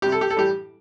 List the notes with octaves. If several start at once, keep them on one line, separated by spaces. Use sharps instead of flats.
C3 G3 G4
A4
G4
A4
A2 E3 G3 G4